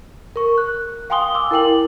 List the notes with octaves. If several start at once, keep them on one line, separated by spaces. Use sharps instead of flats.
A#4 C#6
F#6
F5 G5 G#5 C6 D#6 G7
D6 E6
E4 A#4 G5 F#7